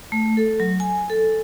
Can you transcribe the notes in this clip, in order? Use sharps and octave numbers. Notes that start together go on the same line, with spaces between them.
A3
A4
F#3
G#5
A4